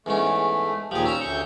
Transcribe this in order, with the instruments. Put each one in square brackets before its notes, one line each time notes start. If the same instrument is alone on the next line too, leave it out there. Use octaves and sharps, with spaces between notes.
[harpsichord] E2 G#2 C#4 [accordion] A3
[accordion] D#2 A#2 G4 [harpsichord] F3 G#4
[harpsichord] C#4 A#5 [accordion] E6
[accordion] D2 C#6 G6